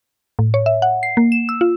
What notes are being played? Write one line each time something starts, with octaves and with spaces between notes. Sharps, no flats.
A2
C#5
E5
F#5
C7
A#3
E7
E6
F4